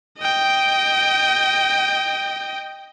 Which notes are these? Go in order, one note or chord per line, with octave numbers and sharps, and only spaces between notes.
D#5 G5